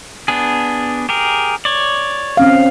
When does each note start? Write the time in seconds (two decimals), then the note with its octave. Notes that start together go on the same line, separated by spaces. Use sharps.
0.28 B3 D4 G#4
1.09 G4 G#4 A#4
1.65 C#5 D5
2.37 C4 C#4 F5